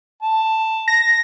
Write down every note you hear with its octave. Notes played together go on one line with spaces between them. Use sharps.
A5
A#6